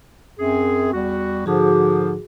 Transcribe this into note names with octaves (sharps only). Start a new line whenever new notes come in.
F#2 C4 G#4
E2 G3 F#4
G#2 D3 F3 F#4 G#4 D6